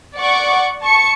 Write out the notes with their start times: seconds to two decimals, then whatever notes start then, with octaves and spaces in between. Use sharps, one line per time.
0.17 D5 F#5 C#6 D6
0.81 A5 C#6 C#7